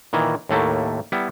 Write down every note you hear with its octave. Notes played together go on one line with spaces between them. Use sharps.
A#2 D#3 E3
D#2 A2 A3 A#3
G3 B3 E4